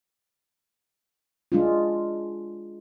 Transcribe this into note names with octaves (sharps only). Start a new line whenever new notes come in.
G#3 D4 F4